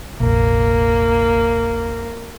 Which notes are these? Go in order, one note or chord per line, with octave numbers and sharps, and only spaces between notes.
F1 A#1 A#3